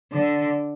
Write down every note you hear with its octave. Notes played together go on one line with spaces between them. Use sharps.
D3